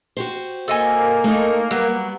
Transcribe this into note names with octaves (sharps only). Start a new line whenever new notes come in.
F#4 G4 C5
A#3 A4 D#5 G#5
A3 D#4
F#3 G3 B3